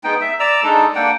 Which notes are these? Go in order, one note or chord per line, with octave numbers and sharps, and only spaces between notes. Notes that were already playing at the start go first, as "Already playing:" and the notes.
G#3 B3 D#4 G5
E5
D5 A#5 E6
G#3 D4 D#4 A4
A#3 D4 F#5 G5